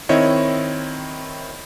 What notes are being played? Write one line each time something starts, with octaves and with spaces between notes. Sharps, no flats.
D#3 C4 E4 C#5 D#5